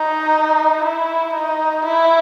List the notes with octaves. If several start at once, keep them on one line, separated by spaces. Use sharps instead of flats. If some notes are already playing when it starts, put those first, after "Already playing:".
Already playing: D#4
E4
D#4
E4